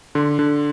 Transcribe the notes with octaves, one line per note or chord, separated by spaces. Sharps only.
D3 C6
D3